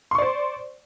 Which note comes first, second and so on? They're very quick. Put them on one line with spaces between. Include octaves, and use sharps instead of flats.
C6 C#6 D5 C5